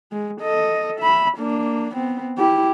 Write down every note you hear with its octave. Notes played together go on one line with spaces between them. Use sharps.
G#3
A4 D#5
E5 B5
A#3 D4
B3 C4
E4 G4